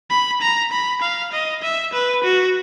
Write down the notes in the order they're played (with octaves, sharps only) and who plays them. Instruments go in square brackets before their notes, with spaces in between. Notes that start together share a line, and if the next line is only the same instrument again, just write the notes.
[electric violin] B5
A#5
B5
F5
D#5
E5
B4
F#4